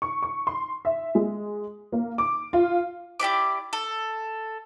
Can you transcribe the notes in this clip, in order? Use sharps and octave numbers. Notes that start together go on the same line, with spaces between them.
C#6
C#6
C6
E5
G#3
A#3
D6
F4
E4 G4 D5 D6
A4